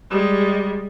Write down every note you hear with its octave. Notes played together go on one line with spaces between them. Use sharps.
G3 G#3